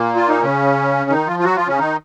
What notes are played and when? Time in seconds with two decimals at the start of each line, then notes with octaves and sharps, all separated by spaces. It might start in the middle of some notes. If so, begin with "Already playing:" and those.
Already playing: A#2 A#3
0.16 F4
0.29 D#4
0.42 C#3 C#4
1.10 D#3 D#4
1.27 F3 F4
1.39 F4
1.44 F#3 F#4
1.56 F3 F4
1.67 C#3 C#4
1.78 D#3 D#4